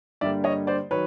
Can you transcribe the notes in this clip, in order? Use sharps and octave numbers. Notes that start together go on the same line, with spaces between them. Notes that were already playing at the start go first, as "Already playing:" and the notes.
G2 D3 G3 A#3 D5 E5
C#5 D#5
C5 D5
D#3 F#3 B4 C#5